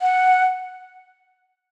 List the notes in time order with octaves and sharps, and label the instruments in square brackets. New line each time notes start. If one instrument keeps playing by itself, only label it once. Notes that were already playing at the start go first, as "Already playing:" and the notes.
[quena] F#5